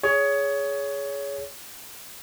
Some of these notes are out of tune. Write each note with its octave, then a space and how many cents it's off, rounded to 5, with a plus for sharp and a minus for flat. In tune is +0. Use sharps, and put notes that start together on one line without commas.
G#4 +0 C#5 +20